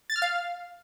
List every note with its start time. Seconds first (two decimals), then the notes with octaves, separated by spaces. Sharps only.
0.10 A6
0.16 F6
0.22 F5